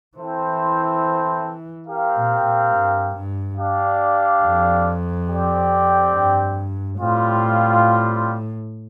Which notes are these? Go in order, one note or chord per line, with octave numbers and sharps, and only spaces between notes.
E3 C4 E4 A4 C5
C4 G4 A#4 F5
A#2
A#2
G2
G2
D4 G4 D5 F5
F2
C4 G4 D5 G5
G2
A2 G3 C4 F4